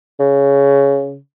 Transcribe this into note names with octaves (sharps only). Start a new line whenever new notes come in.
C#3